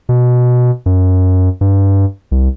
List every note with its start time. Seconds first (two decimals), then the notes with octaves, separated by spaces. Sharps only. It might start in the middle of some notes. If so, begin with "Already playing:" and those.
0.09 B2
0.86 F#2
1.61 G2
2.31 C2